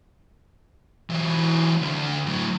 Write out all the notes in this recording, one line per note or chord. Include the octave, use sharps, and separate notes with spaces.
E3 F#3
D2 D3
A2 F#3